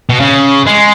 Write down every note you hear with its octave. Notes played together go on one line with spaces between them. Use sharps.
B2
C#3
G#3